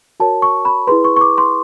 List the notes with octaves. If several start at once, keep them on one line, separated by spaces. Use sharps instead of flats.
F#4 A#4 C#5 A5
C#6
B5
E4 G#4 B4 C6
C#6
C#6
D6
C6